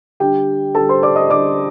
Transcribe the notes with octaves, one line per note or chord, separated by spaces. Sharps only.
D3 G3 D4 G4 G5
D3 G3 D4 A4 A5
C5 C6
D5 D6
D#5 D#6
D3 G3 D4 D5 D6